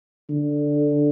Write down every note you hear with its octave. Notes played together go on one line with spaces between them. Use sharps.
D3